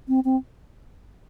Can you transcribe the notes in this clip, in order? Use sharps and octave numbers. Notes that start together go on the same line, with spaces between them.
C4
C4